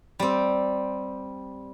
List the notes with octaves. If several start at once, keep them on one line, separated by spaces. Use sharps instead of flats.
G3 C4